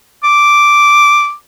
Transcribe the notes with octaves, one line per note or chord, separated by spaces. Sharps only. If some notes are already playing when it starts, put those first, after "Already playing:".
D6